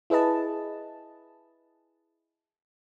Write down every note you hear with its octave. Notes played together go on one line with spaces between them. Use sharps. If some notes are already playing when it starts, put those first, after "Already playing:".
E4 G#4 B4 D#5 A5